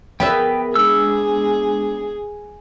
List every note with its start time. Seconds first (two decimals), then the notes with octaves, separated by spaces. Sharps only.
0.20 B3 G#4 A#4 B4 E5 G5
0.75 G#3 D4 G#4 E6